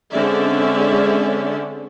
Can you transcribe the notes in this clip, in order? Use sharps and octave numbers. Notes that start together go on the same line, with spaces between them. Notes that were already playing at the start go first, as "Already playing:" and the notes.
D3 G#3 C4 C#4 D5 E5